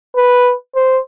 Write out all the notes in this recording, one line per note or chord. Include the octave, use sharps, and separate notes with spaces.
B4
C5